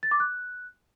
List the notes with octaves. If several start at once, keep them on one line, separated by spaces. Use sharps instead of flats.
A6
D6
F#6